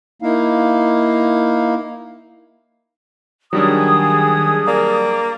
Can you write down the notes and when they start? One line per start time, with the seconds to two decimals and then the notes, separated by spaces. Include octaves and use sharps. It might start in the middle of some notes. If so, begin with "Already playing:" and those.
0.22 A#3 D#4 E4 F5
3.53 D#3 F#3 G3 D4 G#4 D#6
4.68 A#3 D5